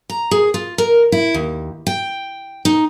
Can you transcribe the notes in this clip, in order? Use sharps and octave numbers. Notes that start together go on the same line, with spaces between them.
A#5
G#4
F4
A#4
E4
D#2
G5
D#4